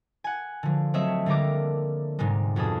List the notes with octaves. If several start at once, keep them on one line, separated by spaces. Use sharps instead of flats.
F#5 G#5
D3 F3
F#3 A3 C4 C#5 D#5 E5
D3 G3 A#3 A#5 D6
G#2 C3 G3 G#3
F2 B2 G#4 A4 D#6